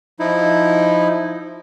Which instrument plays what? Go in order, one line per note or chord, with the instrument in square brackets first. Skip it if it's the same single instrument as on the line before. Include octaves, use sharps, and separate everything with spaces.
[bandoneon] F3 D#4 E4